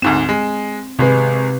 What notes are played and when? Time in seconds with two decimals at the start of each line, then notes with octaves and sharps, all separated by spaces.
0.02 D2 G#2 C4 E7
0.29 G#3
0.99 G#1 C3 G#3 B4